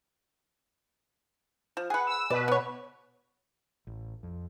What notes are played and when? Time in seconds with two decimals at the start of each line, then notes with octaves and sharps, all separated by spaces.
1.77 F3
1.90 G#4 B4 F#5
2.07 E6
2.30 B2 B4 D5
2.48 B3 C#5
3.87 A1
4.23 F2